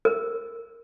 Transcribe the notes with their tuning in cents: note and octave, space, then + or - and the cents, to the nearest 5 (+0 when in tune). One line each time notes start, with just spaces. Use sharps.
A#4 -10